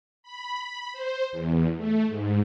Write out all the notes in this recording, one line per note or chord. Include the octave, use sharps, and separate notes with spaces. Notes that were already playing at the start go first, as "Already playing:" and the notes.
B5
C5
E2
A3
G#2